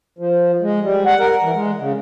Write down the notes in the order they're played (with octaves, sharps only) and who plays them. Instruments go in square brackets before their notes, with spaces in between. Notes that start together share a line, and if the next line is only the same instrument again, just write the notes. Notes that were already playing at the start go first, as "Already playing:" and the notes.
[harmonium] F3
G#3
G3
F#5
A#4
E3
G#3
C#3